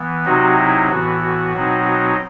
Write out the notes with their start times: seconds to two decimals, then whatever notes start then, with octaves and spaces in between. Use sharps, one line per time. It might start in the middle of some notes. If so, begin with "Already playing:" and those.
Already playing: E3 B3
0.25 C3 F#3 C4 D#4 F#4
0.57 E4
0.89 A2 E3 B3 F#4
1.21 F#4
1.53 B2 F#3 C4 D#4
1.85 F#4